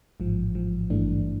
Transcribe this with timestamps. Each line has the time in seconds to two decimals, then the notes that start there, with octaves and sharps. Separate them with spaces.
0.20 A1 G#2 F3
0.55 A1 G#2 F3
0.90 G#1 G2 E3 A3 D4